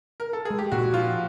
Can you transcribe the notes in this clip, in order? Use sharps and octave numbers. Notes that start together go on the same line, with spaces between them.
A#4
A4
G#3 G#4
G4
A#2 F#4
F3 F4